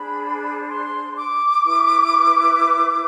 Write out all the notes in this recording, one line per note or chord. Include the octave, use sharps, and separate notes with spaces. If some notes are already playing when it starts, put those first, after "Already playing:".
Already playing: D4 G#4 C5 B5
C6
D6
E4 B4